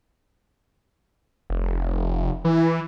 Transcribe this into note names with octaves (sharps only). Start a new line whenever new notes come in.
F1
E3